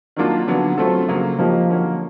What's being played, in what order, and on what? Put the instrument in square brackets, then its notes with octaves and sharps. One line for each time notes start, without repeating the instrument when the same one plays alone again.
[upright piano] D#3 F#3 A#3 D4 F4
D3 F#3 B3 D4
[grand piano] F#3 [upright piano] A3 C4 F4 A4
[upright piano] C#3 F#3 A#3
[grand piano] F3 [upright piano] A#3 D#4 G4
[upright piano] D3 F#3 A#3 C#4